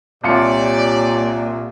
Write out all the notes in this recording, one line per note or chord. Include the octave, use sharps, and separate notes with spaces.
C2 A#2 F4 G4 C#5 D5 C#7